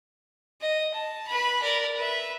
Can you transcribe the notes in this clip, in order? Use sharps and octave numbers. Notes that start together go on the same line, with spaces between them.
D#5
A5
B4 B5
A#4 D5
B4 E5